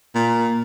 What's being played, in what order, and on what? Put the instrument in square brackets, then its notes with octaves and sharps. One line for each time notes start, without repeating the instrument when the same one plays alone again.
[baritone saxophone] A#2